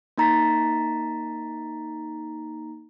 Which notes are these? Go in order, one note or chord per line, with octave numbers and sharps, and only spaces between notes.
A#3 D#4 A#5 A6 B6